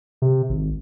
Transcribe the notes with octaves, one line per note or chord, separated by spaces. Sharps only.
C3
G#1